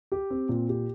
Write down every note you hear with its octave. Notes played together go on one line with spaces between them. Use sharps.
G4
C4
A#2
G4